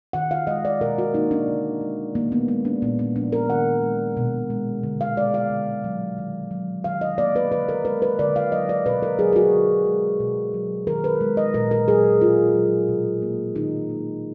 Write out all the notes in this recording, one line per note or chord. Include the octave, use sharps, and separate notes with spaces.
D#3 F#5
F5
G#3 D#5
D5
B2 A#4
F#4
A#3 D#4
D4
D3
G#3
D#3 A#3
B3
G#3 B3
D4
A#2 B3
B3
F3 D4
A#4
D#3 F#5
G#3
B2
G#3
D3
F5
G#3 D5
F5
D3
F#3
D#3
F#3
D#3 F5
D#5
A#3 D5
B4
D3 B4
A#4
G#3 B4
B4
D3 D5
F5
F#3 D#5
D5
B2 B4
A#4
F#3 G#4
G#4
F#4
D3
G#3
B2
F#3
D#3 A#4
B4
G#3
D#5
A#2 A#4
A#4
F#3 G#4
B2 F4
F#3
B2
A#3
D#3 D#4
A#3